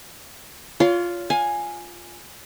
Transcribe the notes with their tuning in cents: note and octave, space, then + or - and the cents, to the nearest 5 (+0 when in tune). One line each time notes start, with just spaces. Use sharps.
F4 +0 C#5 +35 C6 +0
F5 +30 G#5 +0